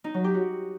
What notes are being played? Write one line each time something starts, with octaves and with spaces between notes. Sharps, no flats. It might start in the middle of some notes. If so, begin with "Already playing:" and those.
D#4
F#3
G4
F#4